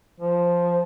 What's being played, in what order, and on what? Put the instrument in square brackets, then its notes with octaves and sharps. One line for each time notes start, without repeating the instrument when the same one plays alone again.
[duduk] F3